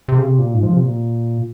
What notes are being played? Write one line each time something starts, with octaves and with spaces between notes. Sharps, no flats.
C3
C#3
C3
A#2
G#2
F3
C3
A#2